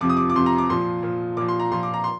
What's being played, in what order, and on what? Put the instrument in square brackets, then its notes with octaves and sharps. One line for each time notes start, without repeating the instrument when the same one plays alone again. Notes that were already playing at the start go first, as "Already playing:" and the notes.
[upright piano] F2 C3 F3 D6
D#6
D6
D6
F2 C3 F3 C6
A#5
D6
A#2 F3 C6
A#2 F3
A#2 F3 D6
C6
A#5
A#2 F3 C6
D6
A#5
C6